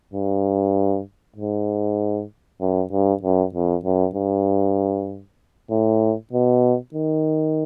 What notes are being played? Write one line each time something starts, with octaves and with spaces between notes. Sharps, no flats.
G2
G#2
F#2
G2
F#2
F2
F#2
G2
A2
B2
D#3